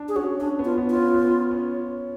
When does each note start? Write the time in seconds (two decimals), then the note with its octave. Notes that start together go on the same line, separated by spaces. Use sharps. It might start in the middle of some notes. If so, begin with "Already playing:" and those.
Already playing: D4
0.08 G#4
0.16 C#4 F#4
0.40 C#4 D4
0.59 B3
0.65 F4
0.78 B3
0.90 F4
0.95 C#4
1.14 B3
1.51 C#4